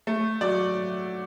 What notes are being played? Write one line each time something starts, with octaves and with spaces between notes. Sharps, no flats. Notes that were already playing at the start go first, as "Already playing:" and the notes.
A3
F#3 D5